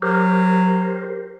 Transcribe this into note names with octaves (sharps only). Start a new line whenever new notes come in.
F#3 G4 A#4 C5